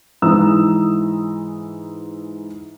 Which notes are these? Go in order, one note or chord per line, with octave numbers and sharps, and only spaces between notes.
G#2 E3 A#5 D#6 E6